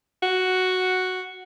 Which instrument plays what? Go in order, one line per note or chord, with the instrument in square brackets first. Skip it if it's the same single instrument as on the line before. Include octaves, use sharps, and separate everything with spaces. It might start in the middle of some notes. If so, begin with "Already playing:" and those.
[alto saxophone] F#4